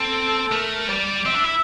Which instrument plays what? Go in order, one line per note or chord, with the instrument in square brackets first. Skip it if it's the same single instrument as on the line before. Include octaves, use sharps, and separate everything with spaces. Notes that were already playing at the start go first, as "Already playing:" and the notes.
Already playing: [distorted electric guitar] C4 [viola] A4
[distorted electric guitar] A3 [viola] A#4
[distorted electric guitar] G3 [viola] D5
[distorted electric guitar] C4 [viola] E5
[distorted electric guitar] D4
E4